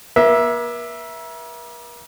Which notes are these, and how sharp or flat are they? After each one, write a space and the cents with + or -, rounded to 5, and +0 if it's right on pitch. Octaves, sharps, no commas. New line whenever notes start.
A#3 +45 E5 +0